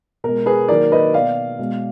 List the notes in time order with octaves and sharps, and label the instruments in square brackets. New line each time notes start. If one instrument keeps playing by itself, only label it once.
[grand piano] B2 G#3 A#4
G#4 B4
D#3 F#3 A#3 A#4 D5
B4 D#5
B2 A#3 D5 F5
B2 G#3